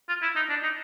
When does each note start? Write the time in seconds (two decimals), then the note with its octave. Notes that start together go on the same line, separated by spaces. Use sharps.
0.09 F4
0.22 E4
0.36 D#4
0.49 D4
0.63 D#4